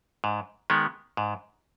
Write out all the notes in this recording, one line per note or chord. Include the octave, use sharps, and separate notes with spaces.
G#2
D#3 G#3 B3
G#2